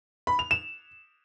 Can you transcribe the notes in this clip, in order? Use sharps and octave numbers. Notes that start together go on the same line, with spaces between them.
B5
F7
E7